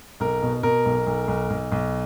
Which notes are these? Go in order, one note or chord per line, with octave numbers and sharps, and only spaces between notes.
B1 A#4
B2
B2 A#4
B1
B1
B1
B1
B1